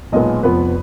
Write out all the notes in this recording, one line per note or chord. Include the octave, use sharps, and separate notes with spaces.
B1 A#2 G#3 B3 D#5
F1 F2 F3 B3 B4